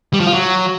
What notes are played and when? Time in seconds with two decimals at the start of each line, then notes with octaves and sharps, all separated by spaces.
0.13 G3
0.20 F3
0.27 F4
0.34 F#3